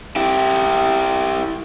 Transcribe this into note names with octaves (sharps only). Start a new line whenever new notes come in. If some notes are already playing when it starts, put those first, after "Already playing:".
E4 G4